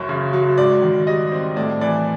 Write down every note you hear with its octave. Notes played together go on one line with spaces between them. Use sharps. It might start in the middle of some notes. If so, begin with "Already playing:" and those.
Already playing: F#1 F#2 C#5
C#3
F#3
G#2 D5
D#3
G3 D#5
C4
A2 D5
E3 D5